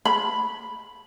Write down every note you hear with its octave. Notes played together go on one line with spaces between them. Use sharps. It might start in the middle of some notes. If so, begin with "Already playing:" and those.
B5